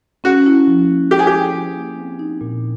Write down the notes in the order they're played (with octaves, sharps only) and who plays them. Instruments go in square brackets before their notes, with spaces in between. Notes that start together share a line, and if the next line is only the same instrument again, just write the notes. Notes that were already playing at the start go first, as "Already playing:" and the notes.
[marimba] C#4 [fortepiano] F#4
[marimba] E4
F3
A#3
[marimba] C#4 [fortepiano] G4
[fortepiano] G#4
G4
[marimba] E4
F3
A#3
C4
D#4
A#2